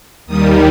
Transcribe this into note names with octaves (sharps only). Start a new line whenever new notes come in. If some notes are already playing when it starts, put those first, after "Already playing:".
D#2 D#3 G3 D#6